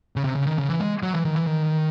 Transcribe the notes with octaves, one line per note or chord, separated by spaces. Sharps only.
C#3
C3
C#3
D#3
C#3
E3
G#3
F#3
E3
D#3
E3
D#3